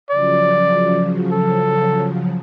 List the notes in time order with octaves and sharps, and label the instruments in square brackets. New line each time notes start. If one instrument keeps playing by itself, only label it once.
[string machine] C#3 F3 F#3 [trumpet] D5
[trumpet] A4